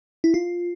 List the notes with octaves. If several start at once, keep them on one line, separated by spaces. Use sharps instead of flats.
E4
F4